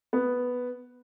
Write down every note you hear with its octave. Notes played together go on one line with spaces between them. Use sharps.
B3